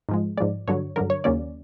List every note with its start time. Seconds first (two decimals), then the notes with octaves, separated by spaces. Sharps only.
0.09 G#2 F3 G#3
0.37 G#2 F3 G#3 D5
0.68 G2 D3 F#3 C#5
0.96 G2 D3 F#3 A#4
1.10 C#5
1.24 D#2 C#3 F#3 A#3 C#4 D5